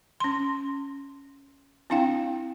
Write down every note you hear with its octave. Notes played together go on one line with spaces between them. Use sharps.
C#4 C6
C4 D4 E4 F5 G5